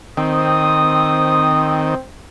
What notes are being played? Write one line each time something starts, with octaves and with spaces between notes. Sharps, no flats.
D#3 C4 D#6